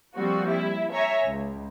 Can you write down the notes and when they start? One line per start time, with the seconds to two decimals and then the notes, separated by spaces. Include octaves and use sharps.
0.16 F3 G3 A#3 C4 F#4
0.50 E4
0.93 C#5 E5 G#5 A#5
1.25 C#2